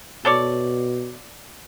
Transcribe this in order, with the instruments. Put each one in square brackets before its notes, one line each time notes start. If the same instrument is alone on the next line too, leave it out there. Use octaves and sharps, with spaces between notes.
[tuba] B2 [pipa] A4 C#5 D5